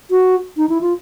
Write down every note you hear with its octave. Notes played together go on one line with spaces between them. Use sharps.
F#4
D#4
E4
F4